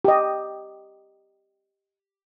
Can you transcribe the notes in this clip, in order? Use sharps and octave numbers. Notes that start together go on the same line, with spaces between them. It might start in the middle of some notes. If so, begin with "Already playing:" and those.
G4 D#5